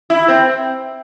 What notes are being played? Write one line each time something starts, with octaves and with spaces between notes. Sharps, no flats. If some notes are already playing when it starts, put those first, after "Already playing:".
E4
C4